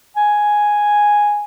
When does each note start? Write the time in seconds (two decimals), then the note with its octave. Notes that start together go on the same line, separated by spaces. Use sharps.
0.16 G#5